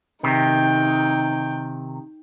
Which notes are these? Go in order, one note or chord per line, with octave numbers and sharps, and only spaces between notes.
C3 D#3 D#4 G5